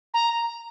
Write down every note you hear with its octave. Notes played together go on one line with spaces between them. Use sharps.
A#5